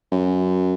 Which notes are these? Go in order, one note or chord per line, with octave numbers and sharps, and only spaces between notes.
F#2